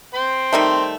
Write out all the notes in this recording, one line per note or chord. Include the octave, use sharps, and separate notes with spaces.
C5 G5 C6
D#3 G3 A3